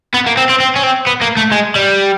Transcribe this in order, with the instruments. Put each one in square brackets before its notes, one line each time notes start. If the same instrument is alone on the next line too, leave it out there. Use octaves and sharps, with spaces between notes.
[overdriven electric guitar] B3
A#3
C4
C4
C4
C#4
C4
B3
A#3
A3
G#3
G3